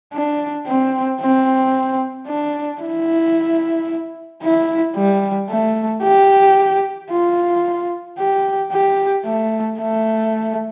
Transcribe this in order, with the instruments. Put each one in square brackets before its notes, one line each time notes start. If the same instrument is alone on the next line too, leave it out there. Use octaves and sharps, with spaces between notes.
[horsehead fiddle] D4
C4
C4
D4
E4
E4
G3
A3
G4
F4
G4
G4
A3
A3